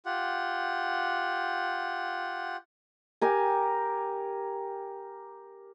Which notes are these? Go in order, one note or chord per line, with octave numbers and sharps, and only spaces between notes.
F4 G4 F#5
G4 A#4 G#5